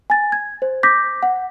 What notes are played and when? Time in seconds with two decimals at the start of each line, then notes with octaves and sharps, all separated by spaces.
0.10 G#5 A6
0.32 G#6
0.62 C5
0.83 D6 G6 A#6 B6
1.23 F#5